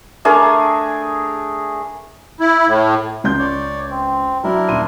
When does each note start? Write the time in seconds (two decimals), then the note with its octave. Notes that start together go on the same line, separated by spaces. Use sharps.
0.25 A3 D4 G#4 A#4
2.40 E4
2.67 A2
3.24 C#2 C6 G6
3.39 C#5 D5
3.91 C4
4.44 F#3 D4 E4 A#4
4.69 D#1 C6 D#7